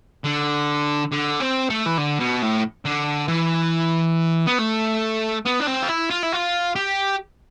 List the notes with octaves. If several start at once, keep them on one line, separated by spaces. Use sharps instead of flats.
D3
D3
C4
A3
E3
D3
B2
A2
D3
E3
B3
A3
B3
D4
C4
F4
E4
F4
E4
F4
G4